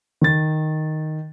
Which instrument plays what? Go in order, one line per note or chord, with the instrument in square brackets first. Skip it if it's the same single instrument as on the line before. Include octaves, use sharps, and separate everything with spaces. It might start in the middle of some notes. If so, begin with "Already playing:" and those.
[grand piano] D#3 A6